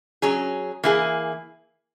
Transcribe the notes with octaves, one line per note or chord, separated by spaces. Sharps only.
F#3 C#4 G#4
E3 A#3 E4 G#4